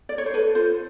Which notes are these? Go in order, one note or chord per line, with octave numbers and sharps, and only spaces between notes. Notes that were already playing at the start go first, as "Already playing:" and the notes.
D5
C#5
C5
A4 B4
F4 C5